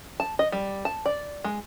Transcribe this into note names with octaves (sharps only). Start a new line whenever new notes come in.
A5
D#5
G3
A5
D5
G#3